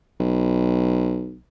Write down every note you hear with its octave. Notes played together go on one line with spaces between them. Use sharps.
B1